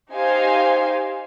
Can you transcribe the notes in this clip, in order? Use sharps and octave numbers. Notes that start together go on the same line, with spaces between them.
D#4 G4 C5 F5 G#5